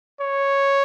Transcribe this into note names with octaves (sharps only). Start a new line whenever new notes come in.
C#5